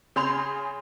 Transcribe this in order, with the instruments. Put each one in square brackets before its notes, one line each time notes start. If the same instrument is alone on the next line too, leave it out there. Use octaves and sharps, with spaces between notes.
[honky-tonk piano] C#3 G#4 B5 C6 G6 F7